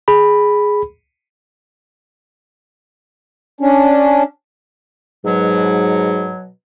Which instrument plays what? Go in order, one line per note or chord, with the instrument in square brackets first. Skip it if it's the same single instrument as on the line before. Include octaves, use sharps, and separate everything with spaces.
[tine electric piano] G#4 B5
[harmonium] C#4 D4
[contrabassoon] G#2 [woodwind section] B2 F#3